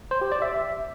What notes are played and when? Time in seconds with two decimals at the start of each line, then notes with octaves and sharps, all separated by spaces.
0.11 C5
0.21 G4
0.32 D5
0.42 E5